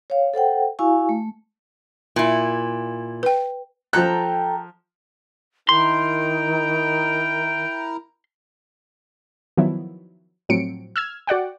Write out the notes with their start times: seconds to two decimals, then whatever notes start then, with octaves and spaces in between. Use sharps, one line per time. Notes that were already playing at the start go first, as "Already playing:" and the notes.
0.10 C#5 F5
0.34 A4 C5 F#5 G5
0.79 E4 F#4 F5 G#5 C#6
1.09 A3
2.16 A#2 E4
3.23 B4 G5
3.93 F3 A4 G5 A#5 F#6
5.69 D#3 E4 A#4 G5 A#5 C6
9.57 D#3 F3 F#3 B3 E4
10.49 A2 F3 F#3 C4 C#7 D7
10.96 E6 F6 G#6
11.27 F#4 D5 F#5 G5